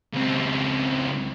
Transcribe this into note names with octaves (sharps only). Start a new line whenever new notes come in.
C#2 C4